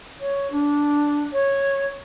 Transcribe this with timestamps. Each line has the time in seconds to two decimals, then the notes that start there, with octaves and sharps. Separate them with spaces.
0.20 C#5
0.51 D4
1.32 C#5